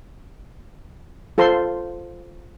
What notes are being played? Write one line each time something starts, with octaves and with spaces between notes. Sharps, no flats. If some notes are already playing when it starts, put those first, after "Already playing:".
F4 A4 C5 C6